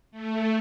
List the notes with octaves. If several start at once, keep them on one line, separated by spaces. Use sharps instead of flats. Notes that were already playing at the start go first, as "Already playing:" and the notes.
A3